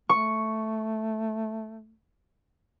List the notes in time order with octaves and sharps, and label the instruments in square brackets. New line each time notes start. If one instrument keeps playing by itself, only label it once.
[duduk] A3 [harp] C#6